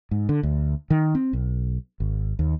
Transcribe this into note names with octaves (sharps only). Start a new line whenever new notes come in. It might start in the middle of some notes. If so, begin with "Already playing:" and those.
G#2
D3
D2
D#3
C4
B1
G#1
D#2